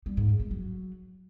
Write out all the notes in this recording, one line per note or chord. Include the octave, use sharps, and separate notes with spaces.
G3
G#2
F#2
G#3
F#3